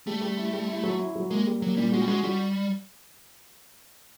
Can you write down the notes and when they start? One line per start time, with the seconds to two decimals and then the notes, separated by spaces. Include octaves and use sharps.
0.07 G3 A3
0.21 G3
0.37 E4
0.53 G3
0.68 E4
0.83 F#3
0.99 E4
1.15 F#3
1.30 G#3 A#3
1.47 G3
1.61 F#3 A#3
1.77 A#2 G3
1.92 G#3 F#4
2.01 G3
2.08 G#3 F#4
2.23 G3 F#4